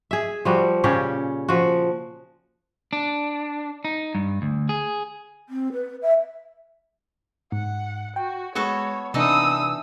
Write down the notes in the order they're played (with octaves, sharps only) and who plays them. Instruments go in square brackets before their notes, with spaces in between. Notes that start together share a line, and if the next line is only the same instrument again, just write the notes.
[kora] G#4 E5
F3 G3 F#4
A#2 C#3 C#4 G4
F3 F#4
[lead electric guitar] D4
D#4
G2
D2
G#4
[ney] C4
B4
E5
[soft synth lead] G#2 [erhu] F#5
[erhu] F#4 [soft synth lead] G5
[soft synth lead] G#3 [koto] B3 F#4 A4 [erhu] C#5
[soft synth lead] C3 [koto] E3 D#4 A4 [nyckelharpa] D4 D#6 [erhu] E6